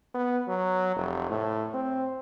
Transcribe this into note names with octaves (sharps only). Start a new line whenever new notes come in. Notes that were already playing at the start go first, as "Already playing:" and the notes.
B3
F#3
F1
A2
C4